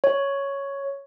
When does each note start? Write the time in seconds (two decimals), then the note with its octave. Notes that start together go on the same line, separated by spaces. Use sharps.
0.04 C#5